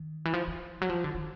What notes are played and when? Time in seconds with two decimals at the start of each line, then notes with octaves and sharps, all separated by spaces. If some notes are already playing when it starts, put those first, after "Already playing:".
Already playing: D#3
0.25 E3
0.33 F3
0.48 F3
0.81 F#3
0.89 F3
1.04 D3
1.15 D#3